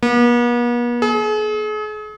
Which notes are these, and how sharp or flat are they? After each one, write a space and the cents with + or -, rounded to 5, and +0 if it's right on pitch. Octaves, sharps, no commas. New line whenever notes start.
B3 -45
G#4 +40